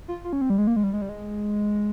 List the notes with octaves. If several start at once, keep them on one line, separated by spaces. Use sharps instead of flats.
F4
F4
C#4
C4
G3
G#3
A#3
G#3
G3
G#3
G3
G#3